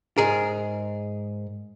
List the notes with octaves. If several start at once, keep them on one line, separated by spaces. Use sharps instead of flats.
G#2 G#4 A#4